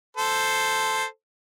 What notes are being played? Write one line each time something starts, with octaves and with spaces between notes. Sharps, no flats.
A4 C5